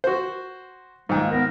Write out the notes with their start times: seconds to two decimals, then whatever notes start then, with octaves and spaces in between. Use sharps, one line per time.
0.04 F#4 C5
1.09 C#2 G#2 D#3 G#3 A#3
1.31 B3 A#4